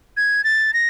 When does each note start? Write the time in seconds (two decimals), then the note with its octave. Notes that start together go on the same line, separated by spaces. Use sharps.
0.17 G#6
0.44 A6
0.74 A#6